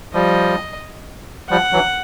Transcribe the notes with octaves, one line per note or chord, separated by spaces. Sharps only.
F3 G3 D#5
F3 G3 F#5
E3 F#3